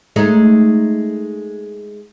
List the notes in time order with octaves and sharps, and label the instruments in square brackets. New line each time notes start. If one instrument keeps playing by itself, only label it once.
[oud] G#3 A3 D#4